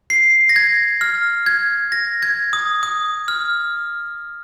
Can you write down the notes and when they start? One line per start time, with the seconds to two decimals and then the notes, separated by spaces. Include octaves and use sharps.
0.10 C7
0.49 A#6
0.56 G#6
1.01 F6
1.46 G#6
1.92 A#6
2.22 G#6
2.53 D#6
2.83 D#6
3.28 F6